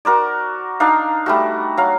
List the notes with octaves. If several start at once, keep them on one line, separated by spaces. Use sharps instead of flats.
F#4 A#4 C5 D5
D4 D#4 F5
G3 A3 F#4
F#3 F5